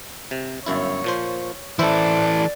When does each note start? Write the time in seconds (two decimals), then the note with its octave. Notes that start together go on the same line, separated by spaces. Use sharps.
0.31 C3
0.66 G1 F#2 E4 C#5
1.04 A#2 F3 C5
1.79 E3 E4 A4 C5 D5 E5